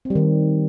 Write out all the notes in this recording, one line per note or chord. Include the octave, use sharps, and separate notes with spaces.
C4
G3
D#3